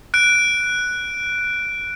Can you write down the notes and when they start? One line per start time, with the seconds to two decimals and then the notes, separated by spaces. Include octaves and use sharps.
0.14 F#6 D7